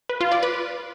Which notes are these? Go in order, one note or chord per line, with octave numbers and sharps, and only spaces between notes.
B4
F4
D5
B4